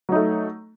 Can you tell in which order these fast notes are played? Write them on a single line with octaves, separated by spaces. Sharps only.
F#3 D#4 A3